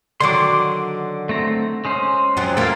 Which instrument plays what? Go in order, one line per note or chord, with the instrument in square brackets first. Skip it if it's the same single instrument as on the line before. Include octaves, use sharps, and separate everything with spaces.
[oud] D3 D#3 F#3 [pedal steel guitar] C6 D6
[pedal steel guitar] A3 C4 A#5
G#3 C#4 C5
[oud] F2 F3 F#3
[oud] E3 A#3 [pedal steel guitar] A4 F5